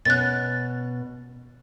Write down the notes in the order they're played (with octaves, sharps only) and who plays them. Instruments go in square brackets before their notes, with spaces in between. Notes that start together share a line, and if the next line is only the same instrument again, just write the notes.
[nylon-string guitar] B2 C#4 [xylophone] F#6 A6